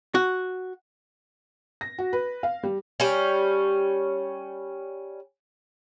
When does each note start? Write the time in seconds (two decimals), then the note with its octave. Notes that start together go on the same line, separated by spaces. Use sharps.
0.15 F#4
1.81 A#6
1.98 F#4
2.13 B4
2.43 F5
2.63 G3
3.00 G3 C#4